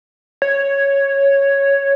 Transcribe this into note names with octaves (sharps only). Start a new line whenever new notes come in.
C#5